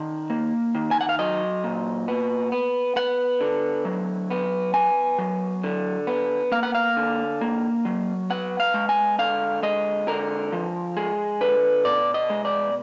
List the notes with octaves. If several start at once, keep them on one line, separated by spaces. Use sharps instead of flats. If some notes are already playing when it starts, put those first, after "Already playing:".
Already playing: D#3 F#5
A#3
D#3
G#5
F#5
F5
F#3 D#5
A#2
B3
B3
B3 F#5
D3
F#3
B3
B3 G#5
F#3
D3
B3
A#3 F5
F#5
F5
D3
A#3
F#3
B3 F#5
F5
G#3
G#5
D3 F5
G#3 D#5
D3 A#4
F3
G#3 G#4
D3 B4
B2 D5
D#5
G#3
D5